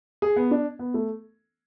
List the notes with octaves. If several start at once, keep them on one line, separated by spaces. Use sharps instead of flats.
G#4
B3
D4
B3
A3